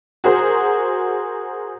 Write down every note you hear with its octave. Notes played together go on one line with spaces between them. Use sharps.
F#4 G#4 A#4 C5